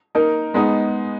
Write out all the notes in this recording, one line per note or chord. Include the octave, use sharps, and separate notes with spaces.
A#3 D#4 A#4
G#3 B3 D#4